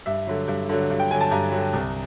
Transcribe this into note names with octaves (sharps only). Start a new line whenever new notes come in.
G2 E5
D3 F#3
G2
D3 F#3
G2
G5
D3 F#3 G#5
A5
G2 A#5
D3 F#3
C2